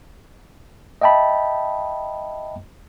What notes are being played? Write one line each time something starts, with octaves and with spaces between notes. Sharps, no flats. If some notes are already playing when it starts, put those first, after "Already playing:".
D#5 E5 G5 A5 B5